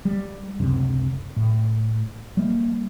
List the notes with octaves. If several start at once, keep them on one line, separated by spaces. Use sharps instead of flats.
G3
C#2 F#2 C3 F#3
A2
G3 A#3